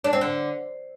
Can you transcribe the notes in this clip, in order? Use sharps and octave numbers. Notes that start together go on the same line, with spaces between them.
D4
C4
D3